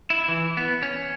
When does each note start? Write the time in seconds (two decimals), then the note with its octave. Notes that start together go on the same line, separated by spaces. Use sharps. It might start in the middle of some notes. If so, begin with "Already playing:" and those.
0.10 E4
0.28 E3
0.57 B3
0.83 C#4